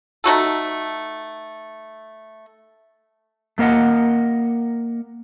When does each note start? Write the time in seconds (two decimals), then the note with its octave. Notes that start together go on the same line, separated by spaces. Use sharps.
0.24 A3 D#4 F#4 A4
3.58 A3 A#3 A#4 D#5 F#5